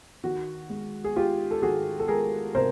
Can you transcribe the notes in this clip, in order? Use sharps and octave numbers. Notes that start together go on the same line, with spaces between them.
D#3 F#4
G#3
G#4
G#3 F4 G4
A4
D#3 F#4 G#4
A4
G#3 G#4 A#4
C3 A#4 C5